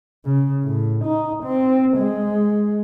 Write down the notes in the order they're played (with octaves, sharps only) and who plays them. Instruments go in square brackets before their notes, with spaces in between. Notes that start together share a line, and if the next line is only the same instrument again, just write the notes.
[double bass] C#3
A2
D#4
C4
G#3